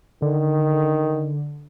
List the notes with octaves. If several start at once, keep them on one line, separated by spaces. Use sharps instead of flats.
D3 D#3